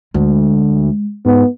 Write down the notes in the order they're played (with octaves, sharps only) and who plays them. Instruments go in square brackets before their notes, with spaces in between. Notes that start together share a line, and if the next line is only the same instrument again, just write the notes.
[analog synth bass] D2 [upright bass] G#3
[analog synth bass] G#2 [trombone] B3